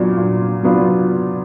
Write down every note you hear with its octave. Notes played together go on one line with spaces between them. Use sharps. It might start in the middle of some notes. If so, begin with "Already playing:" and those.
Already playing: A#2 F#3 B3 D4 F4
A#2
F#3 B3 D4 F4